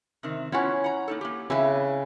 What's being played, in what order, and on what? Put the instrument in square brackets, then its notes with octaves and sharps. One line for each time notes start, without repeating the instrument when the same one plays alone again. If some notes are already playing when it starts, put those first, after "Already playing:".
[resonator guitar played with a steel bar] C3 D#3 C4
[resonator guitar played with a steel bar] B3 F4 F#5 [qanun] C#4 E4
[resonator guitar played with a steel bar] F#5 A#5
A#3 D#4 A4
A#3 G4
[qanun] C#3 B4 [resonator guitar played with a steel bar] C4 E4 E5